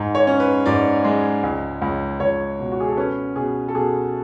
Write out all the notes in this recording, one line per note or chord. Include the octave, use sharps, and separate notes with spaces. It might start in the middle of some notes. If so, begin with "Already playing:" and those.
Already playing: G#2
C#5
C#4
B4
G#2 D5
G#3
C#2
C#2
C#2 C#5
B2
F#4
G#4
A4
C#4 B4
B2 G#4
A4
B2 G#4